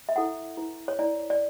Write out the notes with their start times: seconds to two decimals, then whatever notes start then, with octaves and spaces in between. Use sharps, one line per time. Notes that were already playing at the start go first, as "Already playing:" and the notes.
0.09 E5
0.15 E4 A4 C#5 F#5
0.57 E4 B4
0.88 C#5
0.99 E4 B4 D5
1.30 D5